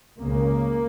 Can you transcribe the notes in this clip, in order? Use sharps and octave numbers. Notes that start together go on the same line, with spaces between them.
C#2 C#3 A#3